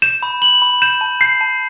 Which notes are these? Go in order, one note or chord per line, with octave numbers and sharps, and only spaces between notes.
G6 E7
B5
B5 F#7
B5
G6 E7
A5
G6 C7
A5